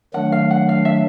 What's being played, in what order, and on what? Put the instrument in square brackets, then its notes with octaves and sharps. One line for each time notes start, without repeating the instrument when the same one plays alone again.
[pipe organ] D#3 F#3 A3 D4 [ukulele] F#5
[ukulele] F5
F#5
F5
E5